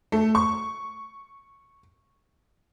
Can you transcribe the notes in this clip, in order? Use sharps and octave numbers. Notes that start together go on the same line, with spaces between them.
A3
C#6